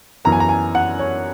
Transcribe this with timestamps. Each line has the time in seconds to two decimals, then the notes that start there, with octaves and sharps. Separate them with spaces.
0.25 F#2 E3 B3 A#5
0.32 G#5
0.40 A#5
0.49 G#5
0.75 F#5
0.99 C#5